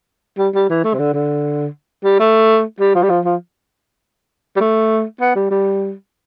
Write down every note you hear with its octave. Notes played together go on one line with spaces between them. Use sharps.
G3
G3
E3
A3
C3
D3
D3
G3
A3
G3
F3
G3
F3
F3
G3
A3
B3
G3
G3